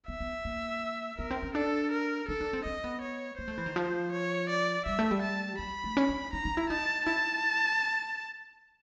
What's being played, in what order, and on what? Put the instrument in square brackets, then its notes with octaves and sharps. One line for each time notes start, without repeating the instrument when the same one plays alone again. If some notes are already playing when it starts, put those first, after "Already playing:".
[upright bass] B3 [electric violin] E5
[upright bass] B3
A#3
[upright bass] B3 [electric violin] A#4
[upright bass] C4
C#4
[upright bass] D4 [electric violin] A4
[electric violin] A#4
[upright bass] D#4 [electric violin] A4
[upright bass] D4
C4
[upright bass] C4 [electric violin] D#5
[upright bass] B3
[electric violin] C#5
[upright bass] A#3 [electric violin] C5
[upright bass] A3
E3
D#3
F3
[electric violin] C#5
D5
[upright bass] G3 [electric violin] E5
[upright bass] A3
G3
[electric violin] A5
[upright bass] F#3 [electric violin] B5
[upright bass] A3
C#4
C#4
[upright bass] D#4 [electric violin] A#5
[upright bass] D#4
E4
[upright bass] D#4 [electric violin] A5
[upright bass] E4 [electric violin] A5